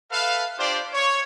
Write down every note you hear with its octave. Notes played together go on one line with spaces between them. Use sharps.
A4 B4 E5 F5
D4 F4 G4 C5 D5
C#5